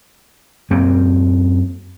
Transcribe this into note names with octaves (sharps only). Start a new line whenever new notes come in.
F#2 A#3 C4